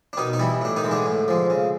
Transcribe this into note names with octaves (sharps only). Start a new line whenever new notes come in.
D4
B2 D#3 D#4
D#4
E3 G3 E4
A2 D4
D#3 D#4
E3 G#3
D3 D4
A2
F3 G#3
C#3